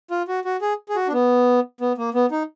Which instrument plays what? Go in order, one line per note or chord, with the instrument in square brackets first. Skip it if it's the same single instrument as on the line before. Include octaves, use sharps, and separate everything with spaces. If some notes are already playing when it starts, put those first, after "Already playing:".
[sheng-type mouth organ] F4
F#4
F#4
G#4
G#4
F#4
D4
B3
B3
A#3
B3
D#4